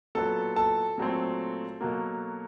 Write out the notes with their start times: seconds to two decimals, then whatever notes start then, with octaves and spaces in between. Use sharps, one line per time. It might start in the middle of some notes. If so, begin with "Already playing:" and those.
0.15 A#2 F#3 B3 A4 A5
0.56 A4 A5
0.98 A#2 F#3 A3 C4
1.81 B2 F#3 A#3